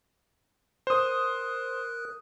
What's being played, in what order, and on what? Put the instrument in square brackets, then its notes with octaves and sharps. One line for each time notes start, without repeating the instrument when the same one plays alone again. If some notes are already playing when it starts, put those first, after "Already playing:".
[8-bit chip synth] A#4 F#6 [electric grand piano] C5 D#6